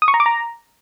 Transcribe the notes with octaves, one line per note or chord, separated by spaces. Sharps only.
D#6
C#6
A#5
D6
A#5